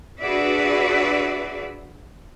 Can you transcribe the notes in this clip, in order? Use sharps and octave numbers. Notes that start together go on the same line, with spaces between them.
D4 F#4 G#4 B4 D5 E5